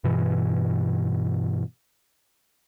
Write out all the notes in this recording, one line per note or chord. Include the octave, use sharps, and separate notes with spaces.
G2 B2 E3